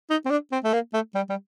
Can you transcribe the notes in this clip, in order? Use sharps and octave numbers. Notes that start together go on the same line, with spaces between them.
D#4
C4
D4
C4
A3
A#3
A3
G3
G3